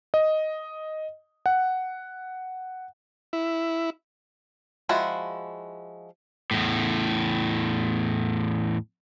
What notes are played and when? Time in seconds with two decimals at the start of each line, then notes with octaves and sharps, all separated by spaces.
0.14 D#5
1.46 F#5
3.33 E4
4.89 F3 G#3 E4 F#4
6.51 E2 A2